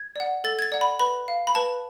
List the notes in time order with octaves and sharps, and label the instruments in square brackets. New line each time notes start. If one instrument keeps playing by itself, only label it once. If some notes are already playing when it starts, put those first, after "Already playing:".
Already playing: [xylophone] G#6
D5 F#5
A4 A6
G#6
A6
D5 F#5
B5
B4 B5
F5
B5
B4 A5